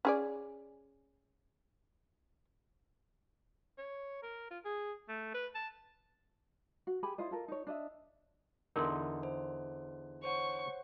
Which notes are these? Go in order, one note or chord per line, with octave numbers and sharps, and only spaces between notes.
C#4 G#4 D5
C#5
A#4
F4
G#4
A3
B4
A5
F#4
G4 G#4 G#5 B5
E4 F4 C5 D#5
F4 A4 A#4
D#4 C#5
D4 D#5 E5
E2 D3 D#4 A#4 C6
C5
C5 C#5 F#5 C#6